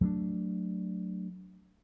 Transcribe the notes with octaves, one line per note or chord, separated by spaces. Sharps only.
F#3 A3 C4 D4